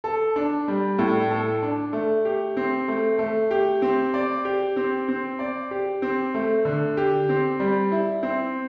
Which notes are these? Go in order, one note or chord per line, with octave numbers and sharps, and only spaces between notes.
A4
D4
G3
A2
A4
D4
A3
G4
C4
A3
A3
G4
C4
D5
G4
C4
C4
D5
G4
C4
A3
D3
G4
C4
G3
E4
C4